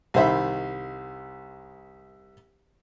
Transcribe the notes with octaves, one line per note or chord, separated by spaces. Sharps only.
C2 D#3 C5 E5 B5